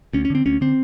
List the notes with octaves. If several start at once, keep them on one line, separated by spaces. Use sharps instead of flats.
D2 C#4
C#4
D3 C4
D2 C#4
D3 C4